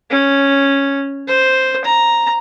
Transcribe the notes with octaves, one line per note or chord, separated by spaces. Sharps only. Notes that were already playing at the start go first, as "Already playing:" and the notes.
C#4
C5
A#5